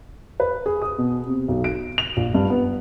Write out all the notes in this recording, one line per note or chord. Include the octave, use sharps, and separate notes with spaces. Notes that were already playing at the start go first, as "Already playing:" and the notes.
B4
G#4
D#6
B2
C3
B1
D7
F7
A#1
G2
B3